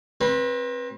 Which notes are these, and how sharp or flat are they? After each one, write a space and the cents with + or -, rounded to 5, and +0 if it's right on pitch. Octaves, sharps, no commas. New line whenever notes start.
C4 +30 B4 -20